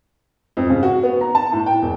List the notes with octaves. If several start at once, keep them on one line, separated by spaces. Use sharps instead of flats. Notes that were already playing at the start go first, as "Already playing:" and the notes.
F2
C#3
F#4
B3
A#5
A5
A2
G5
E1